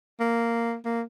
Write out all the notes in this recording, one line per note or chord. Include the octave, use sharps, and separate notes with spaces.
A#3
A#3